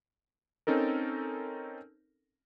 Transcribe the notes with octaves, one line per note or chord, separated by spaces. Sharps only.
C4 C#4 D#4 A4 A#4